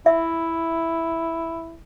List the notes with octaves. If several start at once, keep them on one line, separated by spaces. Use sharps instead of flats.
E4 E5